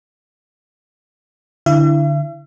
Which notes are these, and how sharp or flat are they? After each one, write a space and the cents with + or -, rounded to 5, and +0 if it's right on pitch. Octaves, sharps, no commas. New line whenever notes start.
D3 +0 E4 +0 E5 +45